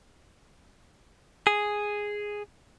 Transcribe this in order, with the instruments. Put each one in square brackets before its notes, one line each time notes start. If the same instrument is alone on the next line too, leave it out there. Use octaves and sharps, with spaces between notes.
[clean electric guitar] G#4